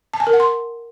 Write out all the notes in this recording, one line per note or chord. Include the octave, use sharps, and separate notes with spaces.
A5
G#5
A#4
F#5
C6